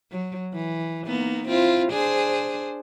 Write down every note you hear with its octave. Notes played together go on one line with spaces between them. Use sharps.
F#3
E3
A#3 B3 D#4
C4 E4 F4
D4 G#4 C5